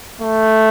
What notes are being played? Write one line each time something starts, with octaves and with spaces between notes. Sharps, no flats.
A3